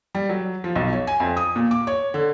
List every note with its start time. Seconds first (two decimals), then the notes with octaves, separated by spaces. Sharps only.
0.15 G3
0.29 F#3
0.64 F3
0.76 B1
0.93 C#5
1.07 G#5
1.20 F2
1.37 D#6
1.56 A#2
1.71 D6
1.87 C#5
2.14 D3